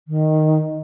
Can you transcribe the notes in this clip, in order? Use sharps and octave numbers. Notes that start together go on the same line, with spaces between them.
D#3